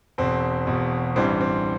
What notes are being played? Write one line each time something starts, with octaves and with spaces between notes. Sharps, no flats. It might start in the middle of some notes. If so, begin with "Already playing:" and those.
E1 E2 B2 C4
E1 E2 B2
A1 G2 E3 G3 C4
C4